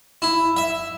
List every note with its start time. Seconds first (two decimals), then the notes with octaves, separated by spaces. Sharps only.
0.22 E4
0.57 E5